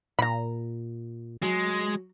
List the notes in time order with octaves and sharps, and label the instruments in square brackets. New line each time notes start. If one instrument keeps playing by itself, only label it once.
[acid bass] A#2 [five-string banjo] A#5 B5
[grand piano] F#3 [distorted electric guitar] G#3